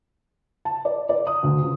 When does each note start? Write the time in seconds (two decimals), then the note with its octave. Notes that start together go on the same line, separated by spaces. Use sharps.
0.65 A5
0.85 D5
1.09 D5
1.27 D#6
1.43 D2
1.63 C#2